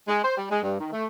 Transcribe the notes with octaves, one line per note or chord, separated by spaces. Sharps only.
G#3
C5
G3
G#3
G2
D#3
A3